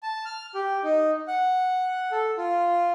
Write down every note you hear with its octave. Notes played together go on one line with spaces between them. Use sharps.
A5
F6
G4
D#4
F#5
A4
F4